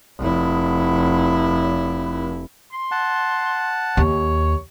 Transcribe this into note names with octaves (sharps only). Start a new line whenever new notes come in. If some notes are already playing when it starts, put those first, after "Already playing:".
F1 E4
C6
F#5 A5
D#2 C#5